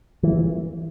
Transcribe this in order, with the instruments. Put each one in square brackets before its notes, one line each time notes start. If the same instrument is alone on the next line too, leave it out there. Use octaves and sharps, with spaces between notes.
[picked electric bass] E3